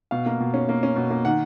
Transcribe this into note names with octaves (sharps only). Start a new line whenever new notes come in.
B2 F5
A#3
B2
C#4
A#3
C#4
B2
A#3
D#3 F#5